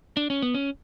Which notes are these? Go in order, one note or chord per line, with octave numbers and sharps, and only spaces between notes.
D4
C#4
B3
C#4